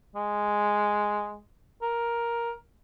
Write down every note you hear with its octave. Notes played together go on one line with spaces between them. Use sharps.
G#3
A#4